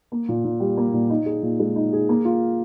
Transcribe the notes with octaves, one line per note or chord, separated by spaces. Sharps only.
A#3
A#2
A#2
G3
A#3
A#2
D#4
G#4
A#2
G#3
D#4
G#4
A#3
F4